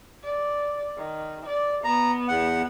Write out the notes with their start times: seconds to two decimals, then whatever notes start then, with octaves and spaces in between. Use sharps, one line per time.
0.24 D5
0.97 D#3
1.46 D5
1.84 B3 A#5
2.28 E2 F#5